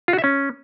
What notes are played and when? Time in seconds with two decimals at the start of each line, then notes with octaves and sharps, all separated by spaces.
0.08 F4
0.13 F#4
0.18 E5
0.24 C#4